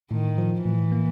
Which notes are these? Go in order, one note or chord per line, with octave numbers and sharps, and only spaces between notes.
A2 D#3
F3
A2 E3
A#3